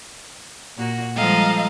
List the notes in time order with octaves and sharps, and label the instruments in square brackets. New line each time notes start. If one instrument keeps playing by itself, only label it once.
[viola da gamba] A#2 A#3 F#4
[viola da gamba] F3 A4 [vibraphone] G3 G#3 A#5 [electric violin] D#5 F5